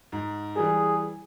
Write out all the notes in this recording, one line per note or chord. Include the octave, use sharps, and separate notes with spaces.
G#2
E3 G3 G#4